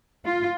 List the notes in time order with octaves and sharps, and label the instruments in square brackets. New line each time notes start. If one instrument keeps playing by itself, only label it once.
[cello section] F4